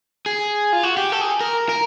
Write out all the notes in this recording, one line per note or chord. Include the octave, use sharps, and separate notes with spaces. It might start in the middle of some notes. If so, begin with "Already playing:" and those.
G#4
F4
F#4
G4
A4
G#4
A#4
A#4